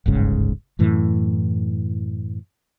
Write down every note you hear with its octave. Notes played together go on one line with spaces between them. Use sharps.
D1 G1 G#2 C#3
F#2 A2 E3